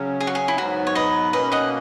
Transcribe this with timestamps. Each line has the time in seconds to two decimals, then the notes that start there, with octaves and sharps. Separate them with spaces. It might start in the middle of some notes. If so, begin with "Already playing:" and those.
Already playing: C#3 F#3 C#4
0.20 G#4
0.27 F#4
0.35 G#4
0.48 E4
0.58 G#2 F#3 B3 F#4
0.87 C#5
0.95 B4 D#5
1.33 B2 A#3 C#4 B4 D#5
1.52 D#5 F#5